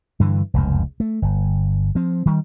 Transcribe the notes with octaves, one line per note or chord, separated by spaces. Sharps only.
G2 D3 E3
F1 C#2 F#2
A3
G1
F3 C4
D#3 G3